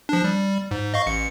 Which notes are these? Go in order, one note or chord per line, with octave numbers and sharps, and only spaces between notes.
F3 D4
G3
G#2
D#5 F5 C#6
A1 C#7